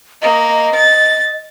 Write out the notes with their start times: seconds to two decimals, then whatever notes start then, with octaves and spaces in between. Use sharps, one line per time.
0.22 A#3 D#5
0.75 A6